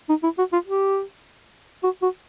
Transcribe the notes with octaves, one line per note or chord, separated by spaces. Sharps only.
D#4
E4
F#4
F4
G4
F#4
F#4